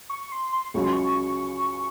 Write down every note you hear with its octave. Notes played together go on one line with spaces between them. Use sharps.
C#6
C#6
C6
C6
C#2 C#3 F#3 C#6
C6
C#6